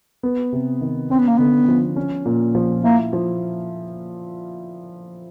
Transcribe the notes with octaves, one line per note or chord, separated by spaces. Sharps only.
B3
C3
D#3
C4 C#4
B3
A#3
D3 B3
F3
C#4
A#2
F3
A#3 E4
F3